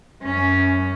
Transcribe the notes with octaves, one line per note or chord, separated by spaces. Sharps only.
F#2 C#4